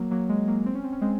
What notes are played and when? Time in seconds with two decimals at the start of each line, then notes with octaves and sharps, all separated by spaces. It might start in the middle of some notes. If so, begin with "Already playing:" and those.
Already playing: F#3 A#3
0.11 F#3 A#3
0.29 G#3
0.48 F#3 A#3
0.66 C4
0.75 C#4
0.84 C4
0.93 C#4
1.01 G#3 C4